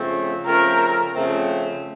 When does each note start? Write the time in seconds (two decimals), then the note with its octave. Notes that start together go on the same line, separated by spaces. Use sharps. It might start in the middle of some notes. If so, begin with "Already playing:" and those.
Already playing: F2 C#3 A3 C4
0.46 F2 C#3 A3 C4 A#4
1.13 F2 C#3 A3 C4